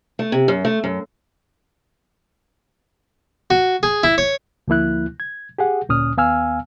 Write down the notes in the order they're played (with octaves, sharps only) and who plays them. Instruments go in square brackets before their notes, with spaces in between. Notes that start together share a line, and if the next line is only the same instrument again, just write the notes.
[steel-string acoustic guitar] A3
C3
F#2
A3
F#2
[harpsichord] F#4
G#4
E4
C#5
[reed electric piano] D2 F3 A#3 E4 F#6
G#6
G4 G#4 F#5
D2 A#2 C#4 D#6 F6
D#2 B3 F5 G#5 E6 F6